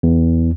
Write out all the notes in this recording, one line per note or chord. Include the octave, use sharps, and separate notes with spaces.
E2